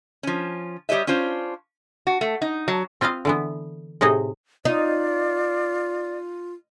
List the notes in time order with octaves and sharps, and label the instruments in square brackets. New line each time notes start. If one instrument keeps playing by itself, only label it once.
[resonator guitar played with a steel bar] F3 C#4
G3 G4 C#5 D#5 E5
C#4 D4 F4 C5
F#4
A3
D#4
F#3
[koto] C4 F4 B4 D#5 F5
D3 E3 B3
A2 C3 D#4 G#4 D#5
[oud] D#4 [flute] F4 [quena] D5